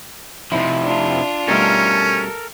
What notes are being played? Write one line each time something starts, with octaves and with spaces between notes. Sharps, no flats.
C3 F3 C4 D#4 E4
D4 F4
B2 G3 A3 C#4 A4 A#4